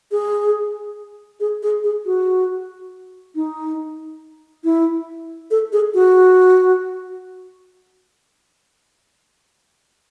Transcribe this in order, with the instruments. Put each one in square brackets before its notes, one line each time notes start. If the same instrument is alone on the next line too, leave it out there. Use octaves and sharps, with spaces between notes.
[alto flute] G#4
G#4
G#4
G#4
F#4
D#4
E4
A4
G#4
F#4